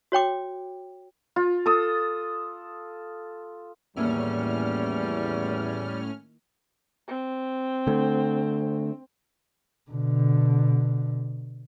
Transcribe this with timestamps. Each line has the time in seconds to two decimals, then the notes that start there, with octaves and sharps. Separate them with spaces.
0.12 F#4 C#5 G5 D6
1.36 F4
1.66 A4 D#6
3.97 E2 A2 D#3 G3 A#3 C#4 E4 F6
7.08 C4
7.87 D3 A3
9.91 B2 D3